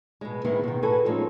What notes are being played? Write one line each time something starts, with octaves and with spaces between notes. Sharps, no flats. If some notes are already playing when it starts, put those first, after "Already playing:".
B2 G#3
D#3 E3 G#3 B3 C4
B2 D#3
F#4 G#4 A4 B4 F#5 G#5
F3 G3 G#3 C4 C#4 D#4